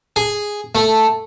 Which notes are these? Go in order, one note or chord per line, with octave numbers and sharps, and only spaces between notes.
G#4
A3